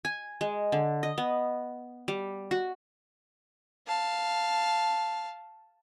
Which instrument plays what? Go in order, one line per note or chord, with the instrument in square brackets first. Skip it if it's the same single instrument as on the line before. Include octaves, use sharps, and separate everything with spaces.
[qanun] G#5
G#3
D3
D#5
B3
G3
F#4
[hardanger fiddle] F5 A5